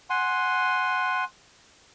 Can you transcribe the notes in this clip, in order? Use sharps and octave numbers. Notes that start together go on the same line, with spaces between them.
F#5 G#5 C6